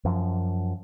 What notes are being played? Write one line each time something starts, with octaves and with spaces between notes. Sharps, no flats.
F#2 F3